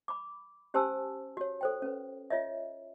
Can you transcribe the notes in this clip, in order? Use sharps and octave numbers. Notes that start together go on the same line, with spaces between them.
B5 D6
C#4 G4 C5 G#5 A5 E6
F#4 C#5
A4 C5 G5
C#4 B4
F4 C#5 D#5 E5